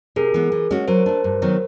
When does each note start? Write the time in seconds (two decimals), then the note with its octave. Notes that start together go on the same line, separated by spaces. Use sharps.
0.16 C3 G#4 A#4
0.34 E3 G#3 B3
0.52 E3
0.71 G#3 C#4 F#4
0.88 F#3 A#4 C5
1.06 A3 D4
1.24 G2
1.42 D#3 F#3 B3